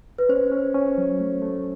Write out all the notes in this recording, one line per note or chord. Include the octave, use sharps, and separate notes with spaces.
B4
C#4 C5
C#4
C#4
F#3
A3
A3